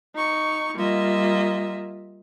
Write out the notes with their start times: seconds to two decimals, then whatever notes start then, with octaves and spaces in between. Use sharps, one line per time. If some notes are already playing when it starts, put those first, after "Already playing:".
0.16 D#4 C#6
0.76 G3 A#3 F4 D#5 E5